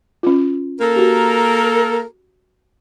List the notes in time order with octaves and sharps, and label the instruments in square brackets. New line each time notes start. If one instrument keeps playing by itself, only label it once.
[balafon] C#4 F4
[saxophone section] A#3 A4 A#4
[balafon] F#4 G4